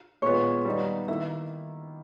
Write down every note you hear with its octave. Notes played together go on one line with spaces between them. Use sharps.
A#2 G#3 B3 C#5
G3 B3 D#4
D#3 A#3 E4 E5